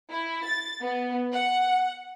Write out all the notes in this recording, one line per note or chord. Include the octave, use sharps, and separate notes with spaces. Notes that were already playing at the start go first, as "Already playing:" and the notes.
E4
A6
B3
F#5